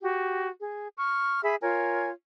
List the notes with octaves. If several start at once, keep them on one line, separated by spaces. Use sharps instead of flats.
F#4 G4
G#4
C#6 F6
G#4 E5 B5
F4 A#4 C#5 G#5